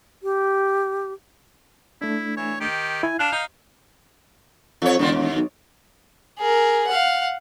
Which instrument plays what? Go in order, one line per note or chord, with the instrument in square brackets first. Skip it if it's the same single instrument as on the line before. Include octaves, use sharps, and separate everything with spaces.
[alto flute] G4
[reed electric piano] A3 D4 [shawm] E4
[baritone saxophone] E3 [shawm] C#5
[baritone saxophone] D#3 [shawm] G4
[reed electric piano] E4 [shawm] G#5
[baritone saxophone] D4 [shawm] F5 [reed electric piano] F#6
[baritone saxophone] D#4 [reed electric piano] G6
[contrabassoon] F2 [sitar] F3 C#5
[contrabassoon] E1 [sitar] D3 D#3 F4
[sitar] D#2
[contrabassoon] B1
[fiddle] G#4 A#4
F5 F#5